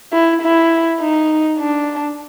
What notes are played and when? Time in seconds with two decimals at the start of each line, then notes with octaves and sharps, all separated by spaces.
0.13 E4
0.42 E4
1.00 D#4
1.58 D4